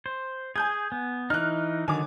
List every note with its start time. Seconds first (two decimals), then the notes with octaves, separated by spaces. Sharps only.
0.06 C5
0.56 G#4 G#5 G6 G#6
0.92 B3
1.30 E3 D#4 F6 F#6
1.88 D3 D#3 F#3 G#5 D6